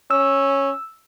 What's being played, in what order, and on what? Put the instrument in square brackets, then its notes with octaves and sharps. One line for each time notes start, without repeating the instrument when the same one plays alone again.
[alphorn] C#4 [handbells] E6